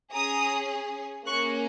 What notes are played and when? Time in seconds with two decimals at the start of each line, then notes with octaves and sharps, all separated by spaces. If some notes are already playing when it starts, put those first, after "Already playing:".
0.13 C#4 G#4 A#5 D#6
1.26 A#3 C#4 G#4 C#6 F#6